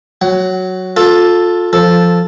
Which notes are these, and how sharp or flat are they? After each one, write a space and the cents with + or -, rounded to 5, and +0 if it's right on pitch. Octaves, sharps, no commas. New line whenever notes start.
F#3 +0 F#5 +25
F4 +25 A4 +0
F3 +0 A4 +0